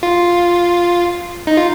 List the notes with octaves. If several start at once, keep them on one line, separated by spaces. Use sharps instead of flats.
F4
D#4
F4